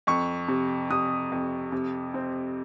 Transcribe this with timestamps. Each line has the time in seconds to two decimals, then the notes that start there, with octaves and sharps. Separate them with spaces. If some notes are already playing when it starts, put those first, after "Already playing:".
0.07 F2 C#6
0.48 C3
0.90 C3 D#6
1.32 F2
1.72 C3
2.14 C4